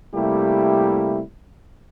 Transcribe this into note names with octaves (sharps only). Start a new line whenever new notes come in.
C3 G3 A3 A#3 E4 G4